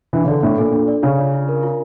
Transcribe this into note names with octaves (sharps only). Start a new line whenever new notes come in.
E3 D4
C#3
D3 D5
A2 D4
A#2 A4
D4
D5
C#3 F4
D5
F4
A#4
F4